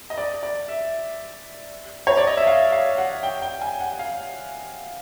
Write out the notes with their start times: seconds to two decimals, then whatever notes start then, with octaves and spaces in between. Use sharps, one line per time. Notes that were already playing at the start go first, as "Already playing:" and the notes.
0.10 D#5
0.18 D5
0.43 D5
0.68 E5
2.07 C#5
2.17 D5
2.27 D#5
2.37 E5
2.47 F5
2.72 F5
2.98 F#5
3.23 G5
3.42 G5
3.62 G#5
3.80 F#5
3.99 F5